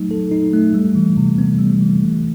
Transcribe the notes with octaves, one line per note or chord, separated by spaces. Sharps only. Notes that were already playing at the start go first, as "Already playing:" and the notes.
Already playing: F#3 A3 D#4
A4
D#4
A3
G3
E3
C3
B3
G3
E3
A3